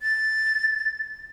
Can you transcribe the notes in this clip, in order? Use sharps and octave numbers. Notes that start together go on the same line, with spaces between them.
A6